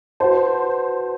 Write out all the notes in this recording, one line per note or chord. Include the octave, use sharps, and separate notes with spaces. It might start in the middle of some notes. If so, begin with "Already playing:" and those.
F#4 B4 C5 F#5 A5